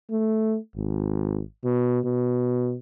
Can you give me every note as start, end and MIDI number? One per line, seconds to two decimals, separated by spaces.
0.11 0.57 57
0.76 1.41 32
1.65 1.99 47
2.05 2.76 47